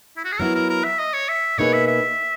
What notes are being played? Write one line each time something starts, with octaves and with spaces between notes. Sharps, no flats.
E4
F#4
G#4
F#3 B3 E4 A#4
A#4
A#4
E5
D#5
C#5
E5
B2 A#3 D#4 G#4 B4 C#5
E5
E5